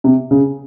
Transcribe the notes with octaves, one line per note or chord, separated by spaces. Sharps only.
C3
C#3